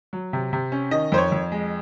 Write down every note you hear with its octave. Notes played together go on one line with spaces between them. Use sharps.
F#3
C3
C3
C#4
D#3 D#5
F2 C5
C#5
F2
G#3